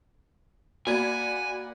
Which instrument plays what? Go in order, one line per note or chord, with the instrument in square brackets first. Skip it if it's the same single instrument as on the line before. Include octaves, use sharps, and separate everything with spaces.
[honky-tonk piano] A#3 D5 D#7 [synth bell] F#4 G#6 [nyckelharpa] F#5 B5 [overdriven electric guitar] G#5